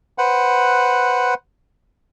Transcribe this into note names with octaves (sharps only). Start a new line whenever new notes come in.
B4 C5 F#5